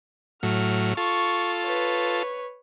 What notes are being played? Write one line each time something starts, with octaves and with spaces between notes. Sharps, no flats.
A2 F#3 F6
F4 A4 C#6
B4 C#5